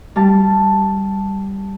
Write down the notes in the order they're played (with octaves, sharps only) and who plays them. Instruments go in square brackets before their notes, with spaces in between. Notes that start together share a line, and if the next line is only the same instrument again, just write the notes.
[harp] G3 A5